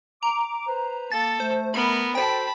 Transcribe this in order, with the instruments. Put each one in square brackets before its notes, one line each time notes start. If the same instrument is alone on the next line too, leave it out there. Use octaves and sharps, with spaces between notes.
[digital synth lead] A#5 [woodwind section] D6
[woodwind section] B4 C5
[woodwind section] A#3 [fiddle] A4 [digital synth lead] A6
[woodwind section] A3 [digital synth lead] C5
[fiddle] B3 A#4 [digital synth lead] B5
[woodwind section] F#4 A4 C5 [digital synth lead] G5 [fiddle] A5 B5